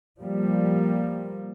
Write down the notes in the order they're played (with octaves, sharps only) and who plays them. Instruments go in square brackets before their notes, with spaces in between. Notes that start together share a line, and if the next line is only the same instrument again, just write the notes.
[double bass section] F3 G3 A#3